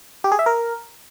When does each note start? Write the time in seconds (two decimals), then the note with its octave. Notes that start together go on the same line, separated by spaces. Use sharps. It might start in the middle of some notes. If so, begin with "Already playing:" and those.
0.24 G4
0.32 G#4
0.39 E5
0.46 A#4